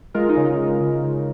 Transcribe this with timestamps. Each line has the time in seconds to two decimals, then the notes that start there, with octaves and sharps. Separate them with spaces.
0.14 G#3 F4 A#4
0.29 D#4
0.37 C#3
0.44 D#4
0.59 C#3
0.81 C#3
1.03 C#3